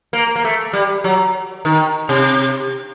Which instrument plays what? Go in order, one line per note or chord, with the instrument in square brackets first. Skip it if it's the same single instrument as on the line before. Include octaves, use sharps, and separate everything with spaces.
[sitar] A#3
A#3
A3
G3
F#3
D#3
C3